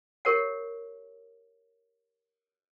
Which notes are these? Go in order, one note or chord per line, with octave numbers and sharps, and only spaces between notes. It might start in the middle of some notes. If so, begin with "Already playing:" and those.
G4 A#4 C#5 F#5